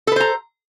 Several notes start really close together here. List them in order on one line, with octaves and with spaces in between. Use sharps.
A4 B4 C5 A#5